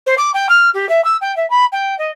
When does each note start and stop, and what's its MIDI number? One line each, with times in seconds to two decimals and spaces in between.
0.06 0.15 72
0.18 0.31 86
0.34 0.47 79
0.49 0.70 89
0.74 0.88 67
0.89 1.03 76
1.04 1.17 88
1.21 1.35 79
1.37 1.48 76
1.50 1.65 83
1.72 1.97 79
1.99 2.11 75